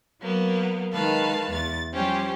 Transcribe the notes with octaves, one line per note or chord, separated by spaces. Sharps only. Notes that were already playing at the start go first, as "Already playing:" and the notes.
F#3 A#3 B3
D#3 G#3 B4 F5 A5
E2 A6
F3 G3 C#4 G4 C5